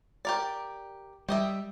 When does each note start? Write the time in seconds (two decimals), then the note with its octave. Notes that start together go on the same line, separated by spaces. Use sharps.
0.25 G4 A#4 D5
1.29 G3 G4 D#5 E5